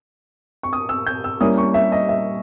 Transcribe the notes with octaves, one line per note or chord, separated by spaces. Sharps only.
C#6
D#6
E6
G6
E6
G3 A#3 C#4 E4 D#6
C#6
E5
D#5
E5